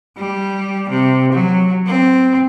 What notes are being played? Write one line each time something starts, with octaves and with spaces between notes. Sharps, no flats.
G3
C3
F#3
C4